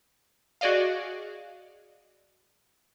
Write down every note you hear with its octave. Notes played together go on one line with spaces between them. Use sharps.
F#4 G#4 D5 D#5 F5